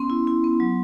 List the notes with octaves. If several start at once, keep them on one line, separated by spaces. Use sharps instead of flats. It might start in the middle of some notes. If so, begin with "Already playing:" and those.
Already playing: B3 C#4 C6
E4
E4
B3
F#3